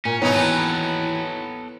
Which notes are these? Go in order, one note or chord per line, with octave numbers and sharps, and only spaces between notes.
A#2 C#4
B2 F#3 B3 D#4 E4 C#5 G#5
D#2 E3 A4 B4